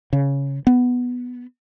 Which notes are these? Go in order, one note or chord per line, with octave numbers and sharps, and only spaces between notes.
C#3
B3